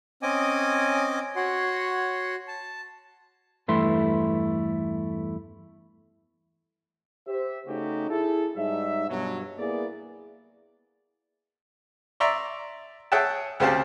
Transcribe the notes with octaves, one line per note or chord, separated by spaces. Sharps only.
C4 C#4 D#5 G#5 D6 D#6
F#4 C#5 F#5 C6
A5
E2 G2 A3 E4 C6
G4 C5 E5
C#3 A3 C#4 D#4 F#4 G4
E4 G#4 A4
G#2 G3 D#4 E5
G2 B2 F#3
A#3 B3 E4 G#4 D5
D5 E5 A#5 C6 C#6
G#4 C#5 E5 F#5 G5 A5
D2 C#3 C4 G4 F5 A5